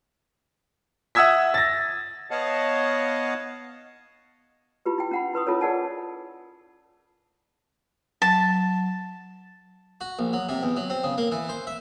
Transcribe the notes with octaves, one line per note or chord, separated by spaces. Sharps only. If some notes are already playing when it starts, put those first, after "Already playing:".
E5 F#5 D#6 E6 G#6 B6
A6 A#6
B3 C#5 D#5 F5 F#5 A5
E4 F4 G4 B4
E4 G5
C#4 F#5 B5
E4 B4 C6 D#6
C#4 E4 F4 A4 A#4 C#5
G#4 A#4 D5 F#5 G#5 A5
F#3 A5
F#4
A#1
F#3
C3
E2
F#3
C4
C#3
A#3
E3
C5
E5